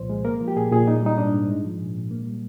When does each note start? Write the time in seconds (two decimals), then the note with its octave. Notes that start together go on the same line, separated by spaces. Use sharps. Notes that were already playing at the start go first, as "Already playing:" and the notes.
Already playing: C2 A#2 F3 C5
0.10 G#3
0.25 A#3 A#4
0.41 F3
0.48 G4
0.56 A#2 G#4
0.72 A#2 G#4
0.87 A#3 D#4
1.02 G3 D#4
1.18 G#2 D4
1.34 G#2
1.49 G#3
1.64 F3
1.80 A#2
1.95 A#2
2.11 A#3
2.27 G3